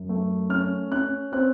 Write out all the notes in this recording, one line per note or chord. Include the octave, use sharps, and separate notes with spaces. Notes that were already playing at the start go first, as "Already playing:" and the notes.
Already playing: F#2
A3
C#4 F6
C#4 F#6
C4 F#6